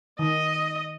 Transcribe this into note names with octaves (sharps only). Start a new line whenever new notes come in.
D#3 D#5